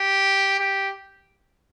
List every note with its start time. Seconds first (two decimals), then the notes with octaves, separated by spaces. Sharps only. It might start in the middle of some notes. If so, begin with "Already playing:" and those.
Already playing: G4
0.60 G4